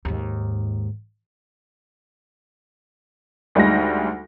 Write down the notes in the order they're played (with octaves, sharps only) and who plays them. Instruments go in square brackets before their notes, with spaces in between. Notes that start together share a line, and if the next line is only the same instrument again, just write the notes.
[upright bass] D#2 G#2
[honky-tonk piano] D2 G3 G#3 D#4 A#6